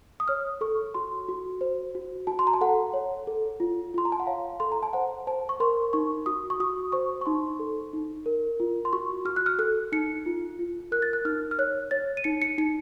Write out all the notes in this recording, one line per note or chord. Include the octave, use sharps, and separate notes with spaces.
D#6
C#5 F6
A4 C#6
F#4 C6
F#4
C5
F#4
F#4 A5
C6
A#5
A5
A4 F#5
C#5
A4
F4
F4 C6
A#5
A5
F#5
C#5 F5
A4 C6
A#5
A5
C5 F#5
C5 A5
C#6
A#4 C6
D#4 C#6
F#4 D#6
C#6
F#4 D#6
C5 C#6
C#6
D#4 C6
A4
D#4
A#4
F4
C6
F#4 C#6
F#4 F6
F#6
F6
A4 F#6
D#4 C#7
F4
F4
A#4 F#6
A6
F#6
D#4 F6
F6
C#5 F#6
C#5 A6
D#7
D#4 C#7
C#7
D#4 C#7